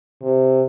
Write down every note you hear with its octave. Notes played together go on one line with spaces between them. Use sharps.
C3